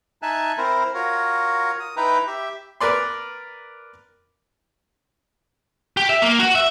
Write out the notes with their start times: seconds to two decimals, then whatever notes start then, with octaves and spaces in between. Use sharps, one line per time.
0.22 D#4 E5 G#5 A5 F#6
0.58 C4 E4 A#4 C5
0.94 F4 F#4 A#4 C#5
1.80 D#6
1.97 D#4 E4 B4 G5 A#5
2.27 G4 E5
2.81 A#4 B4 D5 C6
5.97 G4
6.09 E5
6.22 A#3
6.39 F#4
6.55 E5